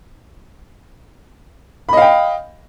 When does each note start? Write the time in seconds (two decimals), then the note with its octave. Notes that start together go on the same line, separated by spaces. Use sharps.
1.89 B5
1.93 D#5
1.97 F5
2.02 G5